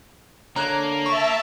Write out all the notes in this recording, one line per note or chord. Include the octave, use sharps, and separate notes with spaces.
D3 A#3 C#5 A#5 F#6
E5 A5 C#6